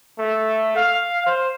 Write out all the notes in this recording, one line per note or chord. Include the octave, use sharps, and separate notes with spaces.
A3
F5
C5